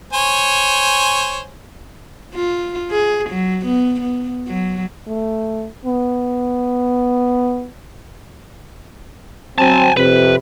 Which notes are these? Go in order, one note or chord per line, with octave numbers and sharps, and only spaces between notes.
C5 C#5 G#5
F4
G#4
F#3
B3
B3
F#3
A3
B3
F#3 C4 G#5 A5
F2 C3 B4